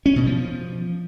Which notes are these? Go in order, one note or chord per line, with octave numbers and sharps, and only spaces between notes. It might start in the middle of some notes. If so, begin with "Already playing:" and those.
C#4
B2
F3